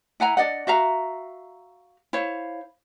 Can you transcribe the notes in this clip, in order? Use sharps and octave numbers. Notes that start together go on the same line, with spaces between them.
E4 F#5 G#5 A#5
D4 D5 D#5 F#5
F#4 E5 F5 A#5
E4 C5 C#5 F5